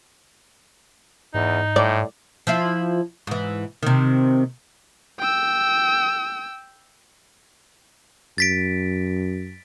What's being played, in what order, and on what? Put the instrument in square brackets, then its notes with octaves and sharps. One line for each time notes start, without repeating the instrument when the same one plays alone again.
[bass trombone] E2 [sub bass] G#2 [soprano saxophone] D#4
[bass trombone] A2 [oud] D5
[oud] F3 E4 F4
G#2 E3
C3 D#3
[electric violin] G5 E6
[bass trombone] F#2 [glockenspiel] A6 B6 D7